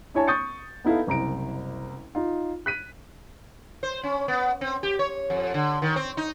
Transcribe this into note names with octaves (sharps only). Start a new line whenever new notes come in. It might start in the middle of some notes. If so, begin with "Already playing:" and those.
D4 E4 C#5 G#5 A5
C#6 D#6 G6 A6 C#7
B3 D#4 E4 A4 F5
F#1 C2 A#5 D7
D#4 F4
F#6 B6 D#7
C5
C#4
B3
C4
G4
C#5
F2
D3
D#3
C4
D#4